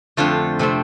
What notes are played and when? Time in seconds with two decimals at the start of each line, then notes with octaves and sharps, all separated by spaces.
0.17 F2 D3 F3 A3 F4
0.59 C3 A3 C4